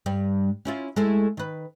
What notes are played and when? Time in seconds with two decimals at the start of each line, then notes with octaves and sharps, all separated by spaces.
0.06 G2 G3
0.65 C#4 E4 F4
0.96 G#3 A3 E4
1.37 D#3 B4